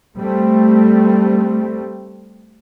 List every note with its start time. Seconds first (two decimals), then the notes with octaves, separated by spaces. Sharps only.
0.17 G3 A3 C4